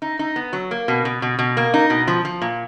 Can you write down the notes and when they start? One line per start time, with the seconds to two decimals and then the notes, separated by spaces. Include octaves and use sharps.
0.02 D#4
0.19 D#4
0.36 B3
0.53 F#3
0.71 A#3
0.88 B2
1.05 B2
1.22 B2
1.39 B2
1.57 A#3
1.74 D#4
1.90 B2
2.08 F3
2.25 F3
2.42 A#2